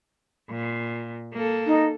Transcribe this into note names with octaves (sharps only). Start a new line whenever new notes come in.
A#2
A#3 A4
D#4